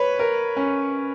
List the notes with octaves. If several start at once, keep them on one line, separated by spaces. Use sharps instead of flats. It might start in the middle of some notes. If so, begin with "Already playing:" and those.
Already playing: B4 C#5
A#4
C#4